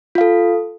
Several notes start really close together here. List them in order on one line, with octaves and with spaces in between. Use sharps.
F4 F5 A4